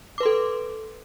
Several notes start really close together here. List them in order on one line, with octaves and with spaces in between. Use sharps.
D6 B4 C6 A4